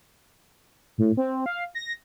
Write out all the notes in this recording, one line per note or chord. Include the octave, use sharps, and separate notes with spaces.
A2
C4
F5
A#6